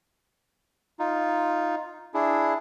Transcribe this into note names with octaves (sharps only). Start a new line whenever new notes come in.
D#4 F4
D4 E4 G#4